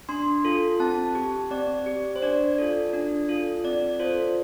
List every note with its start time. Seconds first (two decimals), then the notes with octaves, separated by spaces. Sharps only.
0.09 D4 C6
0.45 F4 A4
0.80 C4 A5
1.15 G4
1.50 C4 D5
1.86 G4
2.16 C5
2.22 D4 D5
2.58 F4 A4
2.93 D4
3.29 F4 A4
3.64 C4 D5
4.00 F4 A4 C5